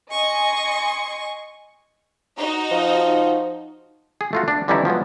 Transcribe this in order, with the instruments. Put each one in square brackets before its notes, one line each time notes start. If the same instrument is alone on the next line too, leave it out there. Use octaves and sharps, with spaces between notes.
[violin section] D#5 G#5 C6 [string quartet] C#6
[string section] D#4 F#4
[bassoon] F3
[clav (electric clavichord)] G#4
A3 F4 F#4
D4
D3 E3 G3 C#4 D#4 E4
F3 F#3 G#3 B3